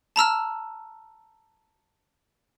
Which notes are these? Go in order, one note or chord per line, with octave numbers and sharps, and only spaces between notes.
A5 A#5 E6 F6